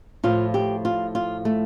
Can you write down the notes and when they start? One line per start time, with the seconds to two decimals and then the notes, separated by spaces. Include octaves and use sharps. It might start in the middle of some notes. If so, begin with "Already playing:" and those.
0.24 A2 F3 F4
0.54 G4
0.85 F4
1.15 F4
1.45 A3